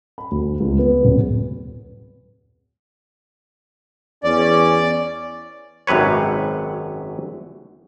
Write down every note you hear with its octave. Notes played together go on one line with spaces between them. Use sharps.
B5
D2
C#2
B3
D1
E2 C#4 D5
G#1 F#2 C3 B4 C#5